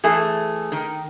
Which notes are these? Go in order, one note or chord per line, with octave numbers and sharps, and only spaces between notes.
E3 A3 G#4
D#3